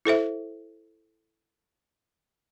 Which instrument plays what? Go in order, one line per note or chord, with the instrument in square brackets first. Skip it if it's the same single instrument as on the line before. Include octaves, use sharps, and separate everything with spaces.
[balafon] E4 A4 C5 E5